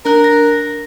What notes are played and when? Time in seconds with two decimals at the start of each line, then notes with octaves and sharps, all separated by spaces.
0.05 D4 A#4 F#6
0.24 A#6